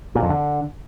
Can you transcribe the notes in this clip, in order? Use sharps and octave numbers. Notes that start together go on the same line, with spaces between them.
A#2
F2
D3